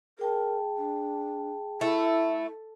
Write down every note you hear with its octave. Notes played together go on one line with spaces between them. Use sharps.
G#4 A#4 G5 A5
D4
A3 E4